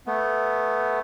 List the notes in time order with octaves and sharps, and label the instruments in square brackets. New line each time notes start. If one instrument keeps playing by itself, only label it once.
[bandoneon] A3 B3